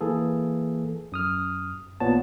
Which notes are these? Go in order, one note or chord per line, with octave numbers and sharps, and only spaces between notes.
E3 A#3 G#4 A4
F#2 D#6 F6
A1 A#2 B3 C#5 A5